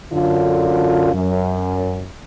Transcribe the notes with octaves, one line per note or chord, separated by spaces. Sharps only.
F#2 D3 F4
F#2